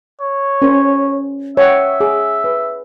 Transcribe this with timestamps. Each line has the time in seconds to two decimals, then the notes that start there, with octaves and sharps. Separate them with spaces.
0.21 C#5
0.62 C#4 A#4 C5
1.57 C#5 E5 F#5 G5
2.00 G#4 D6
2.44 B4